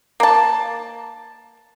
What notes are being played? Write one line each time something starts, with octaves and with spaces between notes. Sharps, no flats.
A#3 A5